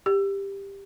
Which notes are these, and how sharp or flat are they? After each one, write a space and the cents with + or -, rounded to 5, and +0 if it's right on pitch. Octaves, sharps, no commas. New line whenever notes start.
G4 +15